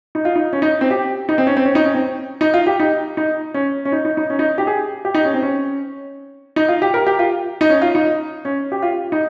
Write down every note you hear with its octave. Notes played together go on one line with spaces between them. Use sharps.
D#4
F4
D#4
C#4
D#4
C4
G4
D#4
C4
C#4
C4
C#4
D#4
C#4
C4
D#4
F4
G4
D#4
D#4
C#4
C#4
D#4
D#4
D#4
C#4
D#4
G4
G#4
G4
D#4
C#4
C4
C#4
D#4
F4
G4
A#4
G4
F4
D#4
C#4
F4
D#4
C#4
G4
F4
D#4